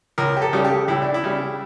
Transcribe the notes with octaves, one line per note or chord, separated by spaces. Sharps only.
C#2 A#4
G4
A4
C#3 G3
G4
C#2 E4
D4
E4
C#3 G3